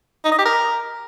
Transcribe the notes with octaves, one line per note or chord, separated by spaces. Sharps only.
D#4
D#5
G4
A#4